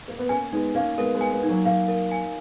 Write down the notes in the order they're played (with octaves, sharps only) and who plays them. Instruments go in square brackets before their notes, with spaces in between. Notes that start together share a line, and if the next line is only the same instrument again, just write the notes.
[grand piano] A#3
B3
[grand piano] A#3 C#4 [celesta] G#5
[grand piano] G#3 B3 [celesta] D#4
[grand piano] A#3 C#4 [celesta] F5
[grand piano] G#3 B3 [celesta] A#4
[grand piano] G#3 B3
[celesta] G#5
[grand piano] G#3 B3
[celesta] D#4
[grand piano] F#3 A#3
[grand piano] F#3 A#3 [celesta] F5
[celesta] A#4
G#5